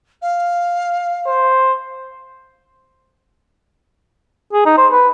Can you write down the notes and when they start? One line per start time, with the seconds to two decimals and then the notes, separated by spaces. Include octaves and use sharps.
0.21 F5
1.27 C5
4.53 G#4
4.65 D#4
4.77 C5
4.91 B4